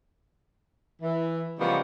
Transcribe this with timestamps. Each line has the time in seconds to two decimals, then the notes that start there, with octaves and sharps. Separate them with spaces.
1.02 E3
1.60 C#3 F3 G3 G#3 A#3 B3